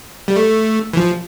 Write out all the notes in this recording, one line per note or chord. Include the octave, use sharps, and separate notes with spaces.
G3
A3
E3
F3